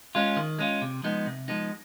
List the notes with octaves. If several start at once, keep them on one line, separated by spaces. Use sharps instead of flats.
G#3 C#4 F4
D#3
G#3 C#4 F4
C3
F3 G#3 B3 D#4
C3
F3 G#3 B3 D#4